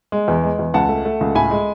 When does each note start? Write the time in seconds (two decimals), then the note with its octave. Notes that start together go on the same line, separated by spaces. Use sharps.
0.12 G#3
0.28 E2
0.43 G#3
0.59 E2
0.74 C#2 F#5 A5
0.89 A3
1.05 A3
1.21 C#2
1.35 A2 G#5 B5
1.51 G#3